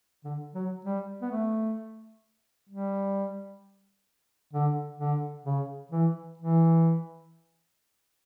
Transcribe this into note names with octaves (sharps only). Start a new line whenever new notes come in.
D3
F#3
G3
B3
A3
G3
D3
D3
C#3
E3
E3